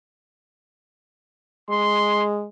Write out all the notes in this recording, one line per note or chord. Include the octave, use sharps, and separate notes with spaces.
G#3 C6